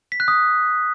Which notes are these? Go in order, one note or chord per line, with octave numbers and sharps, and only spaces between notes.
B6
F#6
D#6